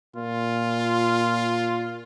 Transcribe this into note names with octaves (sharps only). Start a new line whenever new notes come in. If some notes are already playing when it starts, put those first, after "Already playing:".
A#2 F4